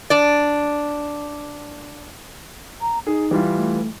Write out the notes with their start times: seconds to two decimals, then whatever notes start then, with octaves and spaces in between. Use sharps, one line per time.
0.10 D4 D5
2.81 A#5
3.07 D#4 G#4
3.31 E3 G3 F4
3.56 A3